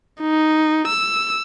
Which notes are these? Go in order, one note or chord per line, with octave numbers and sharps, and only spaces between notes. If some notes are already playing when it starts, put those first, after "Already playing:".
D#4
E6